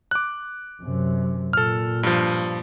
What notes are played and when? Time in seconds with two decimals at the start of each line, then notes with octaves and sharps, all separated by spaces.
0.11 D6 F#6
0.81 F#2 C3
1.53 A#2 A4 F6
2.03 G2 F3